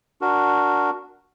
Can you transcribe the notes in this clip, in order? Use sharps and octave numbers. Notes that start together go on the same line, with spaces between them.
D4 F#4 A#4